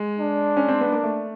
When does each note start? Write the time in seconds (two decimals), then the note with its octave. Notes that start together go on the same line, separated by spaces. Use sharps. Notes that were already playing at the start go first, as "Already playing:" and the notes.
Already playing: G#3
0.19 D4
0.57 C#4
0.68 C4
0.81 B3
0.92 A#3
1.03 A3